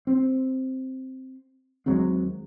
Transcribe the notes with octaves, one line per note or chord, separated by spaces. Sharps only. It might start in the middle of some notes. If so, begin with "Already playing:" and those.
C4
D#2 F#3 G#3 C4